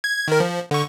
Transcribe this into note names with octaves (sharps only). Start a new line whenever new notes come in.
G#6
D#3 A#4
F3
D3 C#6